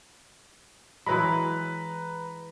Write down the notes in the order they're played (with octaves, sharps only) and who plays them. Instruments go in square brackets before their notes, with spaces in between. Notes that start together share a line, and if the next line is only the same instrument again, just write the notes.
[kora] E3 F#3 G#3 [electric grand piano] B4 A#5 B5